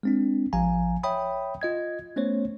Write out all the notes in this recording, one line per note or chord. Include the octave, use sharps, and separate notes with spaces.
G#3 C4 D4
A1 F3 F5 G#5 A#5
C#5 E5 G5 B5 D#6
F4 D#5 G#6
A3 B3 C#4 C5 C#5